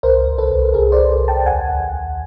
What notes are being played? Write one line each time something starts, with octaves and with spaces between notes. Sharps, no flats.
C2 A#4 C5
C2
A4 B4
C2
C2 G#4 A#4
C5 D5
C2
C2
G5 A5
D#2 F#5 G#5
D#2
D#2